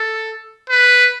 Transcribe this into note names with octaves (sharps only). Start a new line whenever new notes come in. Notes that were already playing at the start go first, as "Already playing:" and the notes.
Already playing: A4
B4